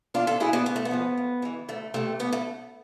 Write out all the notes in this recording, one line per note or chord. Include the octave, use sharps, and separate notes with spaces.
E2 D4 F4
F4 A4
B2 G#3 E4 G#4
B3 D4
G#2 B3
A3
B3
F3 G#3
F2
E3 G#3
D2 A3
C3 E3 A3
E2 B3
A3